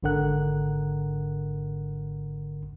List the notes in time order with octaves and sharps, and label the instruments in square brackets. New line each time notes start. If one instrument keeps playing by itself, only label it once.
[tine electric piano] G#1 G#2 D3 A#4 F#5 F#6